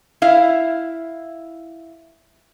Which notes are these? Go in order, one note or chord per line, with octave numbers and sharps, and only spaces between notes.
E4 F5